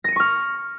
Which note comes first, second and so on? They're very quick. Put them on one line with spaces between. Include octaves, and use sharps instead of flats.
A#6 D#7 C#7 C#6 F6